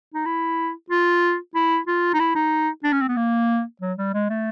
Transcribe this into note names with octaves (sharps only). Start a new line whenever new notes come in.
D#4
E4
F4
E4
F4
D#4
E4
D#4
D4
C#4
C4
B3
A#3
F#3
G3
G#3
A3